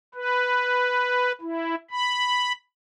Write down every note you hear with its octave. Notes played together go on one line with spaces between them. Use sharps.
B4
E4
B5